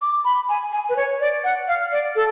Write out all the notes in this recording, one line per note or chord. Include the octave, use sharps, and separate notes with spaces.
D6
B5
G#5
G#5
B4
C#5
D5
F#5
F5
D5
A4